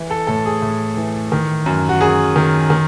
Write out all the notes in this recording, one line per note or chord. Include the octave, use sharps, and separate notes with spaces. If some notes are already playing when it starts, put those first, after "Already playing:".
Already playing: E3
A4
A2 A4
G#4
A2
E3
D#3
F#2
F#4
F#2 G#4
D#3
D#3